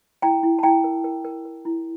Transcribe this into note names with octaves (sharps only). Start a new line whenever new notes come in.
E4 G5 A#5
E4
A5
E4 G5 A#5
A#4
A#4
A#4
A#4
E4